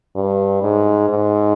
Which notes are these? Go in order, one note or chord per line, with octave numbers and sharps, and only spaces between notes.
G2
G#2
G#2